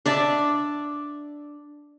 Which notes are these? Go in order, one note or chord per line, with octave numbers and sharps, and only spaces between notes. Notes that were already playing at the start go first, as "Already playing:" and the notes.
D4 D5 E5